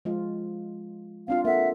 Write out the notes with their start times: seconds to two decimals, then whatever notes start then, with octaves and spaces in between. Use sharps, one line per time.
0.05 F3 G#3 F4
1.28 C4 D4 F4 F5
1.45 A#3 A4 E5 F#5